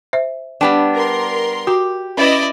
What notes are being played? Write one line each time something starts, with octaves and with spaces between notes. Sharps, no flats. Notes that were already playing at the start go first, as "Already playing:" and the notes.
C5 E5
G3 B3 D4 G5
A#4 C6
F#4 G4
C#4 E4 B4 D5 D#5